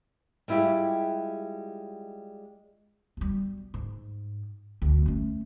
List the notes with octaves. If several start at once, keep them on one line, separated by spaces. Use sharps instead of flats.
G3 G#3 E4 F4 G4
B1 G3
G#2
D2
A3 C#4